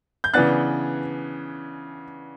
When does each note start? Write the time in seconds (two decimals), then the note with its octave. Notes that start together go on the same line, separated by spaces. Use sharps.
0.24 G6
0.34 C#3 E3 B3 D4 F#6 A6